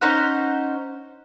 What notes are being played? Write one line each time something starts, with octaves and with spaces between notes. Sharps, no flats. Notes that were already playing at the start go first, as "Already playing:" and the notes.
C#4 D#4 C5 F#5